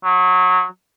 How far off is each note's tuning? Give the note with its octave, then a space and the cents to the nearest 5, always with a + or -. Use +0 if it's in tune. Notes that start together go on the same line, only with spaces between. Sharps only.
F#3 -20